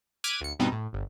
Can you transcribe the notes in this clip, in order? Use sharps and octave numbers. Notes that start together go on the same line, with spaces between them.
D6 F6 F#6 G#6 B6 D#7
D2 C#7
G2 B2 G3 B3 C4 D#4
A2
G1